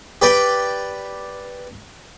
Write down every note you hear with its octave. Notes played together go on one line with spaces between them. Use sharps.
G4 B4 D5 G5